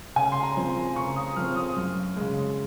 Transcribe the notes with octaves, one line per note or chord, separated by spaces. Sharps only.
C#3 G#5
C6
A#5
F3 C4
C6
C#3 C#6
D#6
F3 C4 F6
D#6
F#2
C#3 G#3